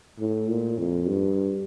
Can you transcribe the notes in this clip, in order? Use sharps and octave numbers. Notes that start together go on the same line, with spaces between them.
A2
A#2
F2
G2